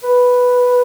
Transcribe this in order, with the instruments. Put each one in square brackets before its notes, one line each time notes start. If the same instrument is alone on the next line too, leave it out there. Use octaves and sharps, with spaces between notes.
[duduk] B4